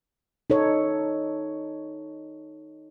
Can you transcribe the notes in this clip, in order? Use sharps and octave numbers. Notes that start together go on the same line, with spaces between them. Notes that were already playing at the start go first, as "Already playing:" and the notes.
D#4 A4 C#5